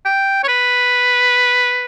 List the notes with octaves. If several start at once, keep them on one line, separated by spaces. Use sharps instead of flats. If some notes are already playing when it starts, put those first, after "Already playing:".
G5
C#5
B4